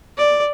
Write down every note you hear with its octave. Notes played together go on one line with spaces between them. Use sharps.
D5